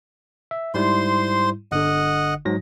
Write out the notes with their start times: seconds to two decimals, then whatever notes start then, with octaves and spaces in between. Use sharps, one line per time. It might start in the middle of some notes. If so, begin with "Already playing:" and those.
0.51 E5
0.74 G#2 G3 E4 C5 C6
1.72 G1 D3 D#5 F#5
2.45 G#2 F#3 A#6